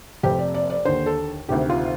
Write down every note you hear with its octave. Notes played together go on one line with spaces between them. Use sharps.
F1 F2 C3 G4
D5
D5
D5
D#2 D3 C5
A4
D2 C3 D#3 G4
F4